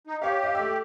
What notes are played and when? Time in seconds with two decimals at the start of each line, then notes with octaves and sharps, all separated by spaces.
0.07 D#4
0.22 G4 C#5 F5
0.43 D#5 F5
0.55 A3 E6